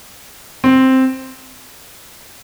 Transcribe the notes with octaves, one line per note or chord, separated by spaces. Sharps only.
C4